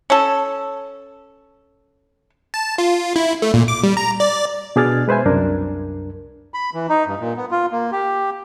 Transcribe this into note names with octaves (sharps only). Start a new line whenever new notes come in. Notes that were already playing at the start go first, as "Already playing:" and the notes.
C#4 A4
A5
F4
E4
A3
A#2
D6
G3
A#5
D5
B2 D4 G#4 D5 F6 A6
G#3 B4 C5 E5 G#5
C2 F#2 D4 A#4
B5
E3
D#4
G2
A#2
B3
F4
A#3
G4